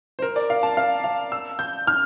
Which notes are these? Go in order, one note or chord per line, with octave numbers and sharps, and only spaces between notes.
C5
A#4
D5
F5
A5
F5
F5
E6
G6
F6